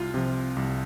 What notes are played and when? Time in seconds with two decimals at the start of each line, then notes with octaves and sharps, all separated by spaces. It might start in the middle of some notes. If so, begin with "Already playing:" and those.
Already playing: C2 F4
0.14 C3 F3
0.56 C2